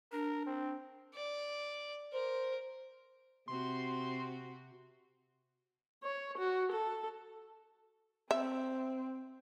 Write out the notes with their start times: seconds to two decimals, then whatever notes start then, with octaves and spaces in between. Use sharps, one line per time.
0.12 D4 A#4
0.47 C4
1.15 D5
2.13 A#4 C5
3.48 C3 C4 F#4 C6
6.03 C#5
6.38 F#4
6.72 A4
8.31 C4 E5